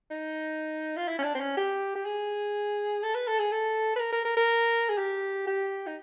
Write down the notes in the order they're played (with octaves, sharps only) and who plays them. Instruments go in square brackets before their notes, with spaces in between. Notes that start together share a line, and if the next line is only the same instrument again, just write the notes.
[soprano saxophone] D#4
F4
E4
C#4
D4
C4
C#4
G4
G4
G#4
A4
B4
A4
G#4
A4
B4
A#4
A#4
A#4
A#4
G#4
G4
G4
D#4